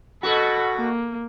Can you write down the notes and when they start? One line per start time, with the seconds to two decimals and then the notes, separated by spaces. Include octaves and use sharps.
0.23 B2 F#4 A4 B5
0.77 A#3